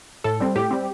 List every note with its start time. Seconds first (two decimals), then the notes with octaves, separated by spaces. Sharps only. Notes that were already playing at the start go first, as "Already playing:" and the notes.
0.24 A2 A4
0.40 G3 C4
0.56 A2 G4
0.71 G3 C4